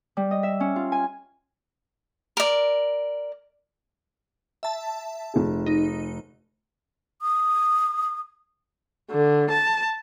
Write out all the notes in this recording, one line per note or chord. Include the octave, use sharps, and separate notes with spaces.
G3
D#5
E5
C#4
F4
G#5
A#4 D5
E5 A5
F1 G#4
D#4
D#6
D3
A5